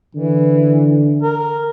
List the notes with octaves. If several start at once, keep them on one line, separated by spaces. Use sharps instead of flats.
D3 E3
A#4